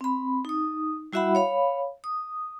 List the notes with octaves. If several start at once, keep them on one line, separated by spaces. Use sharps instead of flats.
C4 B5
D#4 D#6
G3 E4 F#4 E5 F#5 B5
C#5 F5 B5
D#6